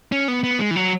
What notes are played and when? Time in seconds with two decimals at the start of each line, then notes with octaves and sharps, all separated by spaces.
0.12 C#4
0.28 B3
0.44 B3
0.60 G#3
0.71 E3
0.76 F#3